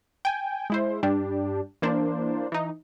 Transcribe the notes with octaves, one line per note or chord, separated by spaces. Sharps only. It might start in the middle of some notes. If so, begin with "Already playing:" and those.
G5 G#5
G#3 E4 C5
G2 G3 D4 G4
E3 A#3 D4 C5
E3 D#4